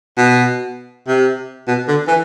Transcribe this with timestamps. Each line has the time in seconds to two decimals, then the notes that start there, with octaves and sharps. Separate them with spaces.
0.17 B2
1.08 C3
1.67 B2
1.88 D3
2.08 E3